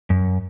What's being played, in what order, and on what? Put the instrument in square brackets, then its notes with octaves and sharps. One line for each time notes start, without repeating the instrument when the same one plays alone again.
[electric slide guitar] F#2